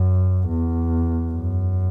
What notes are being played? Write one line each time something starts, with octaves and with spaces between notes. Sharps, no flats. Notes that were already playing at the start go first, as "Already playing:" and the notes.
Already playing: F#2
E2
F#2